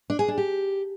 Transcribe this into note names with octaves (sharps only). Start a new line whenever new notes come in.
D4
G#4
D4
G4